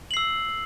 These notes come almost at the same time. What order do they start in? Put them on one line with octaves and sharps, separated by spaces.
F#7 C7 E6